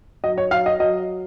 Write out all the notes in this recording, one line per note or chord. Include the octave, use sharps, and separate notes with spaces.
F#3 D#5
C#5
F#3 F5
D#5
F#3 D#5